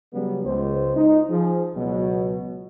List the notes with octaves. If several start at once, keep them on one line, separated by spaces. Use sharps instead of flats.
C#3 F#3 G3 B3
C#2 C5
D#4
F3 G#4
C#2 B2 F#3